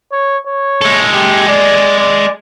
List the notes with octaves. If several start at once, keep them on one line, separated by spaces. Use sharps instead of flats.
C#5
C#5
G#3 A4
G4
D5
D5